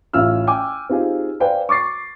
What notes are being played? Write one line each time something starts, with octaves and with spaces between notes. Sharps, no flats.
A1 C#4 E4 F4 E6 F6
G5 G#5 D6
C4 D#4 F4 G4 G#4
B4 C5 D5 F5 G5 G#5
C#6 D6 A6 C7